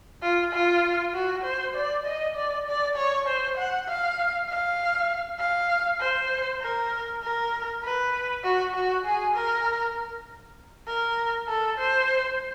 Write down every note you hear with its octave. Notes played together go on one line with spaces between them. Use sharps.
F4
F4
F#4
C5
D5
D#5
D5
D5
C#5
C5
F#5
F5
F5
F5
C5
A#4
A#4
B4
F#4
F#4
G#4
A#4
A#4
A4
C5